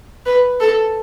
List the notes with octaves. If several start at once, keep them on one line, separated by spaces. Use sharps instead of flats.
B4
A4